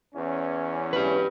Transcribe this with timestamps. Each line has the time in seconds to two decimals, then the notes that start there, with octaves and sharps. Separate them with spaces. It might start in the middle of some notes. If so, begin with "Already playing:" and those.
0.15 E2 E3 C#4
0.93 G4 B4